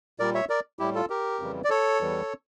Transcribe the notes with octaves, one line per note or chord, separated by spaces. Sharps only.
A#2 G3 A#4 D5
C#5 E5
A#4 D5
A2 G3 E4 G4
F4 A4
G4 A#4
F2 C#3 E3 G3
D5
A4 C#5
E2 E3 G3